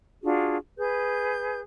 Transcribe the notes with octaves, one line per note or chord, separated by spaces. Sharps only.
D4 F4 F#4 G#4
G#4 B4 G6